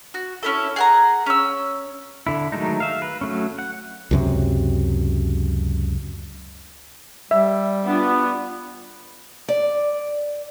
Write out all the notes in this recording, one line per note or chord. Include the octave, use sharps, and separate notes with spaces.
F#4
C#4 E4 A4
G#4 F#5 A#5
C#4 E6
D3 E4
D#3 F#3 G#3 A3 D#4
E5 F5
B4
F#3 A3 C#4
F#5
C#2 F#2 C3
G3 E5
B3 D4 F4
D5